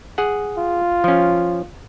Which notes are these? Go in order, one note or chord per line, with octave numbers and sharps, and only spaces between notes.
G#4 F#5
F4
F3 C#4